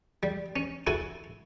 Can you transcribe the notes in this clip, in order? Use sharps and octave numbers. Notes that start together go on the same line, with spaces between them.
G3
C#4
E4 F#4 A4 G#5